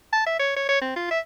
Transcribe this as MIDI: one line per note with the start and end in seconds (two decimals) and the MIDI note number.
0.13 0.24 81
0.26 0.39 76
0.39 0.54 73
0.56 0.66 73
0.69 0.81 73
0.81 0.95 60
0.96 1.07 65
1.11 1.19 76